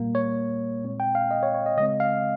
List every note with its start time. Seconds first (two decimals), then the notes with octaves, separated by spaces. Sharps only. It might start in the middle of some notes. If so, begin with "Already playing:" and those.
Already playing: A#2 G3 A#3
0.15 C#5
0.84 A#2 G#3 C4
1.00 G5
1.15 F5
1.31 D#5
1.43 C#5
1.54 C#5
1.66 D#5
1.77 C#3 G#3 C4 D#5
2.00 F5